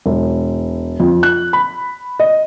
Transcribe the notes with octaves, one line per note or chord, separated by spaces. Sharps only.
E1
F2
F#6
B5
D#5